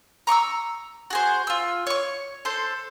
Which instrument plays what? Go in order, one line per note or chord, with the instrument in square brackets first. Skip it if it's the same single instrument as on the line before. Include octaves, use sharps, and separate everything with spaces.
[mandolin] A#5 C#6 D6 E6
F#4 G#4 C5
F4 E6
C#5 C#6
A4 C5